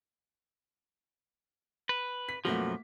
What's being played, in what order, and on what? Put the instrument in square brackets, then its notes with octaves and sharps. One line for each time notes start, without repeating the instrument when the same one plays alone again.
[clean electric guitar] B4
[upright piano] B6
[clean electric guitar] F#2 B2 F3 [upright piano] A3 A#3 F#4